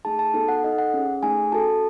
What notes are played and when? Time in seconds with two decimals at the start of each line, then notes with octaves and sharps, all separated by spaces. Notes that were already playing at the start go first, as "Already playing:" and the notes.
0.05 A3 D#4 G#4 A5
0.19 A5
0.34 B3 D#4 F#4 A4
0.48 F#5
0.64 D#4 A4 D#5
0.78 F#5
0.94 C#4 G#4
1.22 A3 D#4 G#4 G#5
1.52 C#4 F#4 A4 A5